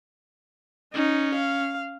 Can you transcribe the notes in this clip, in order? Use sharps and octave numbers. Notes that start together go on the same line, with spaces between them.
C#4 D#4
F5